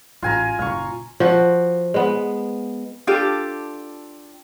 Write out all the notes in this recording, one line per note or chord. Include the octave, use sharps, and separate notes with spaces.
A1 F4 G#5 A#5
F#1 A#2 F5 C#6
F3 F#4
G#3 B3
D4 F4 G4 A4